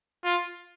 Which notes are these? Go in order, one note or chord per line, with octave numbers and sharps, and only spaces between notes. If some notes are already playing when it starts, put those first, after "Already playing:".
F4